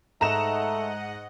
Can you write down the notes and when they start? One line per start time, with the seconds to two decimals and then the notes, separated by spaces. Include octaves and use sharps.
0.21 G#2 A3 D#5 F#5 A#5 E7